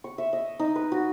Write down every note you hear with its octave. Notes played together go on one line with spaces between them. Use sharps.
C#6
E5
D#5
D#4
B4
F#4